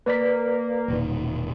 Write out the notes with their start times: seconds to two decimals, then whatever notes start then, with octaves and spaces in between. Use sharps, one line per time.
0.06 A#3 B4 D5 B6
0.88 E1 A#2 D#3